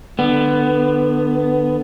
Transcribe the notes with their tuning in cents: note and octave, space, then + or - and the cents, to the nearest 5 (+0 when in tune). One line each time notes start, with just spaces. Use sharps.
D3 +30 B3 +10